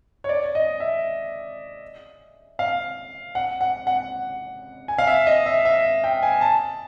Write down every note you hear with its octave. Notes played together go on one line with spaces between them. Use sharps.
C#5
D5
D#5
E5
F5
F#5
F#5
F#5
G#5
F5
E5
D#5
E5
E5
G5
G#5
A5